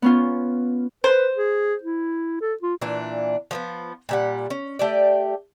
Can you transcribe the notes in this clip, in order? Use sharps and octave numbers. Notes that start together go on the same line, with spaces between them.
B3 C#4 F4
B4 C5
G#4
E4
A4
F4
A#2 E3 D4
F3 A#3 B3
A#2 G3 F#5
C#4
A3 G4 D5